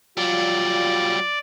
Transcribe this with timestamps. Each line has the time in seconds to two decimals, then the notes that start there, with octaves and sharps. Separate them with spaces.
0.17 F#3 G3 F4 D5